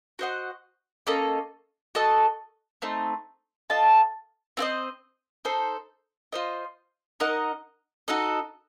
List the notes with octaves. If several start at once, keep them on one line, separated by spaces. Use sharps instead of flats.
F#4 C5 D#5 F#5
A#3 C#4 A4 D#5
F#4 A4 D#5 A5
A3 C4 D#4
F4 A4 D#5 A5
C4 F4 C5 D#5
D#4 A4 C5
F4 C5 D#5
D#4 A#4 D#5 F#5
D#4 F#4 A4 D#5